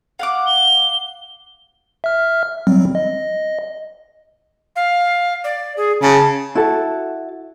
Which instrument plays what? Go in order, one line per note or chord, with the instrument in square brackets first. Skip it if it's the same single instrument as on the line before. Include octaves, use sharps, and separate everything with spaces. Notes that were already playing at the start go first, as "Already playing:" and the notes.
[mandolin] F5 F#5 D6
[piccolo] G7
[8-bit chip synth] E5 F6
F#3 G3 C4
D#5
[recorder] F5
D5
G#4
[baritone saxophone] C#3 [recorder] A5
[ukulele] E4 F#4 A4 A5